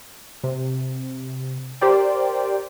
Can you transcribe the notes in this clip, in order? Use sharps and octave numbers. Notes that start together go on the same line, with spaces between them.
C3
G4 A#4 C5 D5 G5